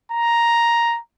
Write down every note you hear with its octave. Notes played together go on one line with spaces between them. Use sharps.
A#5